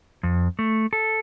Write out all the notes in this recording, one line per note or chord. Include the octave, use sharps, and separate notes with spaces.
F2
A3
A4